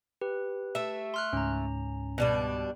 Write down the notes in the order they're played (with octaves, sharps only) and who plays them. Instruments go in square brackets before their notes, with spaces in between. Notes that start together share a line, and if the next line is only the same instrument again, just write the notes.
[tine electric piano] G4 [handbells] B4
[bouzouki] A3 E5
[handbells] C6 F6 F#6
[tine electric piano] C#2 G#2 [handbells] C#4 A#5
[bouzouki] B2 G3 D4